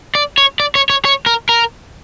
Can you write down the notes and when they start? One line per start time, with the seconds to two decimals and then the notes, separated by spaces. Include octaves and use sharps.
0.15 D5
0.38 C#5
0.60 D5
0.75 C#5
0.90 C#5
1.05 C#5
1.26 A#4
1.49 A#4